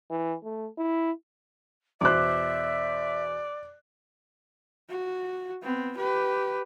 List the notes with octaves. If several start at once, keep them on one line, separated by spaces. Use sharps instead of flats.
E3
A3
E4
E2 B2 C5 D5 E5 D6 F#6
F#4
B3 C4
G4 B4